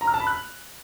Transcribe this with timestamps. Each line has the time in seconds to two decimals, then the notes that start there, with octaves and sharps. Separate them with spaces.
0.01 A#5
0.07 F6
0.14 A5
0.20 B5
0.27 F#6